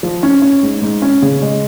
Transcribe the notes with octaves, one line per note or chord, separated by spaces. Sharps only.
F3
C#4
C#4
G#2
G#2
C#4
C#3
G#3